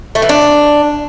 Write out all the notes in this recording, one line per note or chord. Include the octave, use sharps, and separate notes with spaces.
A3
E3
D4